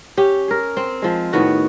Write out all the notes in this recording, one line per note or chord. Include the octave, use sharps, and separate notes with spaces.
C#4 G4
G#4 A#4
C4
F3 G#3
A2 D#3 B3 F#4